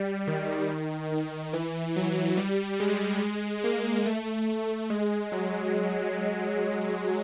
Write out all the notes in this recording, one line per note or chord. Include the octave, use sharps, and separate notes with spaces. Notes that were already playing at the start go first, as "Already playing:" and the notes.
Already playing: G3
D#3
D#3
E3
F#3
G3
G#3
A#3
A3
G#3
F#3